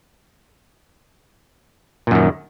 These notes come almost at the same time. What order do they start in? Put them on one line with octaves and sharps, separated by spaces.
A#2 F#2 D#3